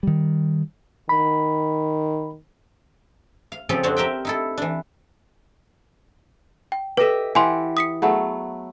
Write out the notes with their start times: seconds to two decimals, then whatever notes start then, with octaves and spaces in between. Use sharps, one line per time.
0.03 D#3 G3
1.09 D#3 B5
3.52 F5
3.69 C#3 F3 C4 F4 G4 A4
3.83 F2 C4 D4 F#4 C5 C#5
3.97 G4 A#4 C5 E5 G5
4.25 D#4 E4 A4
4.58 E3 D4
6.72 G5
6.97 G4 A4 B4 D#5 E5
7.35 E3 G4 F#5 G#5 C6
7.77 D#6 B6 C#7
8.02 F#3 A3 B3 G#4